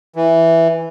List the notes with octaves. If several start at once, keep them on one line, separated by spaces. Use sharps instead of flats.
E3